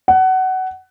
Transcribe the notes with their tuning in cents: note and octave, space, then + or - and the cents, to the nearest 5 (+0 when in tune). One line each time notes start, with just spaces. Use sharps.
F#5 +20